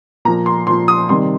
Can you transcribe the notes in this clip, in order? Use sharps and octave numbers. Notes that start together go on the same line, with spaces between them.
A#2 F3 A#5
C6
A#2 F3 C6
D#6
C3 D#3 G3 C6